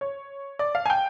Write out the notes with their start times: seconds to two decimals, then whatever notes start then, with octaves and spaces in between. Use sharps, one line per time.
0.01 C#5
0.59 D5
0.75 F5
0.86 G#5
0.90 G5